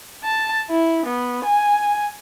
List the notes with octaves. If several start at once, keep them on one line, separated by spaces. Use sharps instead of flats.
A5
E4
B3
G#5